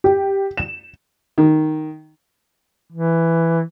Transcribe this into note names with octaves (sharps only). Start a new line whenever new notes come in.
G4
E7
D#3
E3